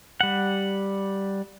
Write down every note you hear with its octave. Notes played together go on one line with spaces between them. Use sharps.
G3 F#5